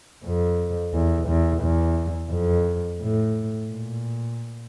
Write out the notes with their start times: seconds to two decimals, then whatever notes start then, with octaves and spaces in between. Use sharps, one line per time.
0.25 F2
0.94 E2
1.28 E2
1.62 E2
2.30 F2
3.00 A2
3.68 A#2